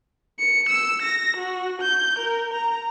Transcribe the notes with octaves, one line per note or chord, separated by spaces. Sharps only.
C#7
E6
A#6
F#4
G6
A#4
A#5